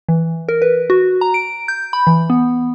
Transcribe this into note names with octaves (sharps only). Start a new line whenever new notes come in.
E3
A#4
B4
F#4
A#5
D7
G6
B5
E3
B3